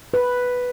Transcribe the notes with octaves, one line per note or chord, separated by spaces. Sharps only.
B4